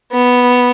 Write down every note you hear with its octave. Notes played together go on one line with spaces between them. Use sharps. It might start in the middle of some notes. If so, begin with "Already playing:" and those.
B3